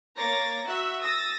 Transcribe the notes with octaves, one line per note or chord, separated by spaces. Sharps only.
A#3 C#5 A#5 D6 A6 A#6
F#4 E5 E6 F#6
D#6 E6 A6 A#6